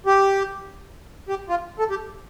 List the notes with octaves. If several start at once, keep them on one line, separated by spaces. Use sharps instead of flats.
G4
G4
F4
A4
G4